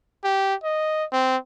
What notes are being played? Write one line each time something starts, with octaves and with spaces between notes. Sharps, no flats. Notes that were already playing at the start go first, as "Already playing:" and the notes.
G4
D#5
C4